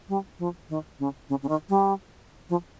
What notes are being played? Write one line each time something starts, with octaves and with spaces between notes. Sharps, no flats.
G3
F3
D#3
C#3
C#3
C#3
D#3
G3
F3